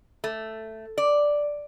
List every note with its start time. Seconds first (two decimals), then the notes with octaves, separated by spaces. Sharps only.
0.24 A3
0.98 D5